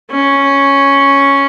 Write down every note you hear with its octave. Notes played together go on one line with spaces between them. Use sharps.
C#4